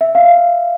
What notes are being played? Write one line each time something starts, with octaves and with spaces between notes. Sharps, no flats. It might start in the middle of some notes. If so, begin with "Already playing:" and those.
E5
F5